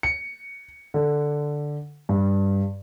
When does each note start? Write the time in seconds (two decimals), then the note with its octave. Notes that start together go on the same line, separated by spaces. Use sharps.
0.03 C#7
0.94 D3
2.09 G2